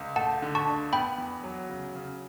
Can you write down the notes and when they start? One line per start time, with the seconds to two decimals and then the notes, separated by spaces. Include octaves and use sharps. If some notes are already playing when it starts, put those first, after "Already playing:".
Already playing: C#2
0.16 A3 F#5 A5
0.42 D3
0.55 A5 C#6
0.67 D4
0.93 B3 G5 B5
1.18 E2
1.44 F#3
1.69 C#3
1.95 C#3